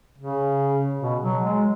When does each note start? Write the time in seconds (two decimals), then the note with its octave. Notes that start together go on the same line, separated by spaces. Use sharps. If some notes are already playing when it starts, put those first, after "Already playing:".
0.18 C#3
1.02 B2
1.23 F#3
1.44 G#3